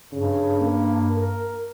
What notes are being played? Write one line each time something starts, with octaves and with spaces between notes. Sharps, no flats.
G2 C#3
A#3
A#4